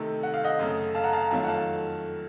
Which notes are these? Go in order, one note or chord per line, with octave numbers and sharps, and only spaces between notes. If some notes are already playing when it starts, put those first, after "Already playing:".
Already playing: C3 D#3 A3
F#5
F5
D#5 F#5
F#2 C#3 A3
F5 A5
F#5 A#5
F5 A5
A#5
F2 D#3 F#3 A3 F5 A5
F#5
F5 A5